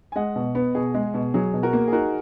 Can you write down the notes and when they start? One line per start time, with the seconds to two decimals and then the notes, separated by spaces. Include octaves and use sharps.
0.12 G#5
0.16 G#3 D#5 F#5
0.36 B2
0.55 B3
0.75 B2 G#4
0.94 G#3
1.14 B2
1.34 F#3 G#4
1.54 B2
1.63 F#4 A#4
1.73 A#3
1.88 G#4
1.92 D#4 F#4 A#4